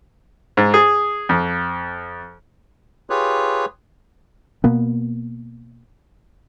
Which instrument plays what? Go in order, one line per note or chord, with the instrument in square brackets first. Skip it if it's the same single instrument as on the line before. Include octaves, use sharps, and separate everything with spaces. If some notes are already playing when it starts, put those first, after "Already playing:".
[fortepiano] G#2
G#4
F2
[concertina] F4 G4 G#4 B4 C#5
[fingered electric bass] B2 A#3 B3